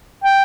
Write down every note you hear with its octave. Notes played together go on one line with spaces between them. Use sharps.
G5